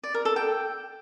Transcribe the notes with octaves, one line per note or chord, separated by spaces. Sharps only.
D5
A#4
A4
G5